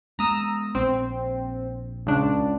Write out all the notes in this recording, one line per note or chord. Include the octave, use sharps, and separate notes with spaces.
G#3 B3 A#5 D#6 E6
A#1 C4
C#2 D4